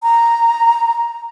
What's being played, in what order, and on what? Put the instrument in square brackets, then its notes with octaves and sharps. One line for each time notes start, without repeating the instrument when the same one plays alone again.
[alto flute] A#5